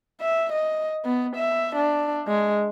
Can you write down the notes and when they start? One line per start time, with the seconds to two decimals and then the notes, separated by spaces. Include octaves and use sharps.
0.21 E5
0.53 D#5
1.05 B3
1.36 E5
1.76 D4
2.27 G#3